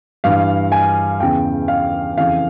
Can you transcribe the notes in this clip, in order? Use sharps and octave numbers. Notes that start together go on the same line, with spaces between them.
G2 E3 F5
G#5
E2 C#3 E3 G5
F5
F2 C#3 E3 F5